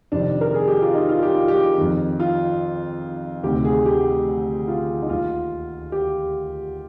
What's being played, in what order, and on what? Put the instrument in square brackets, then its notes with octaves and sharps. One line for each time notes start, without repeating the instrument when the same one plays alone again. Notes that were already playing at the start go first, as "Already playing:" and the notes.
[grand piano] F2 C3 D#3 D4
A#4
G#4
G4
F4
D#4
F4
G4
F4
G4
F2 D#3
F4
D2 C3 D#3 G4
G#4
G4
F4
D#4
D#2 D#3 F4
G4